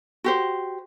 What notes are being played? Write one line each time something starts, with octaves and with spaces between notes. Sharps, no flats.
F#4 G4 C5